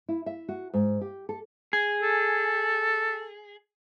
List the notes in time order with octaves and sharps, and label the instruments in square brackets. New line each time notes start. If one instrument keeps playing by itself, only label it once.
[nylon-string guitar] E4
E5
F#4
G#2
G4
A4
[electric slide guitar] G#4
[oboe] A4